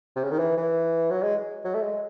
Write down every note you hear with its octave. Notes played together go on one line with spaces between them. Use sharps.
C3
C#3
D#3
E3
E3
F#3
G#3
F#3
A3
G#3